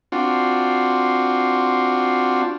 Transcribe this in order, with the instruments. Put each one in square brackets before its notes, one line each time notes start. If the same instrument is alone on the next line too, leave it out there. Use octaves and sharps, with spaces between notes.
[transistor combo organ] C4 D4 F4 F#4